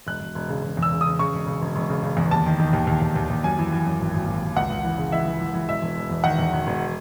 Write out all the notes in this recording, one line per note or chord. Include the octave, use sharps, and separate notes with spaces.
E1 F#6
E1
E1
C#3
E1
E2
E6
C#3
D#6
C#3
C#3 C#6
E1
C#3
E1
E1
C#3
C#3
E2
D#2 A5
D#3
D#3
D#2
D#2
D#2
D#2
D#2
F#2 G#5
E3
E3
F#2
G#1
G#1
G#1
G#1
C#2 F#5
C#2
E3
C#3
E3 E5
E3
E3
E3
E1 E5
E1
E1
E2
D#3 F#5
E2
E1
E1